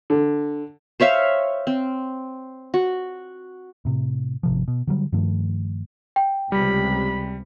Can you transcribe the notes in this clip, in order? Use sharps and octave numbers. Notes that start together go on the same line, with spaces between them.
D3
C5 C#5 E5 F5
C4
F#4
A2 C3
G#1 C3 F3
B2
D3 F#3 G3
G2 D#3 F3 A3
G5
C#2 C3 G3 B5